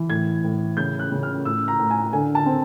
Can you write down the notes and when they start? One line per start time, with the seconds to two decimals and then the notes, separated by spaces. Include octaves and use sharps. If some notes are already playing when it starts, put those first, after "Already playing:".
Already playing: E3
0.10 A2 G#6
0.44 A2
0.77 C#3 G6
0.99 F#6
1.12 C#3
1.23 F6
1.45 A2 E6
1.68 A#5
1.79 A2
1.91 G#5
2.13 D3 G#5
2.35 A5
2.46 C4